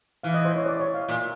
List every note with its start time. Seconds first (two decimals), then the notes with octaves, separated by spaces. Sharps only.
0.23 E3 F5
0.34 D#5
0.45 C5
0.56 C#5
0.66 D5
0.80 C#5
0.94 F5
1.09 A#2